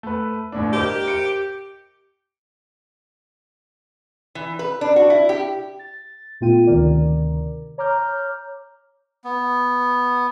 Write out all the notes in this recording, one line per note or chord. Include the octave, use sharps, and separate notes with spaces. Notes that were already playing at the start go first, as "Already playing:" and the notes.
A3 B4
G1 A2 D4
G4 A#4 C5 D#5
C#7 D7
E3
B4
D4
F#4
E4
G4
A6
A#2 A3 B3 F4 G5 D#7
D2 C3 D#3 A#4 D5
C#5 A#5 D6 F6 G6
B3